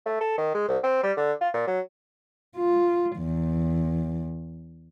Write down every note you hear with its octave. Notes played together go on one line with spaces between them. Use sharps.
A3
A4
D#3
G#3
C2
C4
G3
D3
F4
A#2
F#3
F4
E2